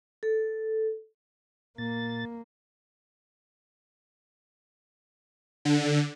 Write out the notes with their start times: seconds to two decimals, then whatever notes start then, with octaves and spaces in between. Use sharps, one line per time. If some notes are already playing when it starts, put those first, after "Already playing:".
0.23 A4
1.78 A#2 A#3 A6
5.65 D3